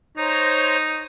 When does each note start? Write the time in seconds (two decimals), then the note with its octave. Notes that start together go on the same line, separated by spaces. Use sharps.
0.17 D#4 C5 C#5 A#5